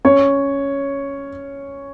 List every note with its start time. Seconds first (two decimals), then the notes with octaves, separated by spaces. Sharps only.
0.05 C#4 C#5